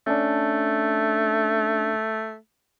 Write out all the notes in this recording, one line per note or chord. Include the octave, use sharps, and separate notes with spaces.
A3 C#4 D4